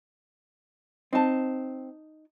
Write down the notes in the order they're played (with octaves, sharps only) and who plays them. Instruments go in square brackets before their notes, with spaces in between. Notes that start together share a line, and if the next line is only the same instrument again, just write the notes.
[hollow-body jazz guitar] C4 [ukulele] D#4 A5